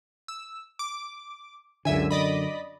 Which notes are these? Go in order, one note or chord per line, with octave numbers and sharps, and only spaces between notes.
E6
D6
C#2 F#2 D3 E5 G#5
D5 D#5 B5